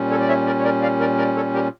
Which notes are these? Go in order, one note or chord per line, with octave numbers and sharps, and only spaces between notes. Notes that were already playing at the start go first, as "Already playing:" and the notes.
Already playing: A#2 G3 C#4
A4 C#5
D5
C#5 E5
A#4 D5
C#5
A#4 D5
D5 F5
A#4 D5
A#4 D5
A4 C#5
G4 A#4